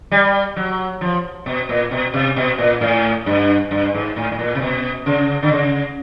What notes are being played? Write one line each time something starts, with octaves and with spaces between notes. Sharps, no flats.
G3
F#3
F3
B2
A#2
B2
C3
B2
A#2
A2
G2
G2
G#2
A2
A2
A#2
C3
B2
C#3
D3
C#3